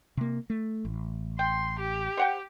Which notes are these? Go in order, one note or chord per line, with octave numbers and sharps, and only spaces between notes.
C3 A#3
A3
A1
G5 C6
G4
C5 F#5 G5